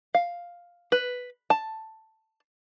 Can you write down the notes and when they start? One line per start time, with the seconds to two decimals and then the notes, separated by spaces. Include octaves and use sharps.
0.15 F5
0.92 B4
1.50 A5